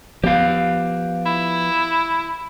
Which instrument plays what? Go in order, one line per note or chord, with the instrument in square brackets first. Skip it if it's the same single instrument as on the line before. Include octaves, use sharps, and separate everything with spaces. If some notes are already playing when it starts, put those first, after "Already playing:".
[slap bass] F3 B3 [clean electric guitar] G4 F5
[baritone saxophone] E4